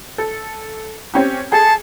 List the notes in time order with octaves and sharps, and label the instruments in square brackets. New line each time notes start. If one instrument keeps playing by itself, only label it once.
[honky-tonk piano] A4
C4 C#4 G4
[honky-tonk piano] G#4 A4 [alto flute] A5